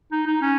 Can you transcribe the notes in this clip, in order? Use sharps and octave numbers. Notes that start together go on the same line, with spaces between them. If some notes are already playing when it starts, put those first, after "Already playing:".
D#4
D#4
C#4